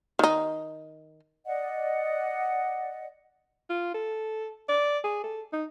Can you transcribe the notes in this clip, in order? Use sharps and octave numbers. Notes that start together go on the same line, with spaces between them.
D#3 D#4
D5 D#5 F#5
F4
A4
D5
G#4
A4
D#4